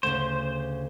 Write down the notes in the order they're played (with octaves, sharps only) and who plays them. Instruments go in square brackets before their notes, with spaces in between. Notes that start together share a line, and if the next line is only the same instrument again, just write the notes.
[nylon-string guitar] D2 C#3 [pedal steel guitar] C5